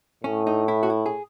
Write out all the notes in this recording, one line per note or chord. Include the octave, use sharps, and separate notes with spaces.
A2 C#4
D#4
E4
F#4
E4
G#4